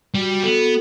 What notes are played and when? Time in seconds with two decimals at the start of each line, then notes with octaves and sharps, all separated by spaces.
0.14 G3 F#4
0.43 B3 A4